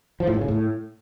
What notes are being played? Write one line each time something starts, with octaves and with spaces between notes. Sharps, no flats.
F3
A2
G2
C#3
A2